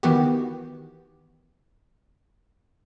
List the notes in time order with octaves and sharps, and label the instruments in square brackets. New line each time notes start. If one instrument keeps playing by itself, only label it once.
[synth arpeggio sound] D#3 E3 B3 F#4 G4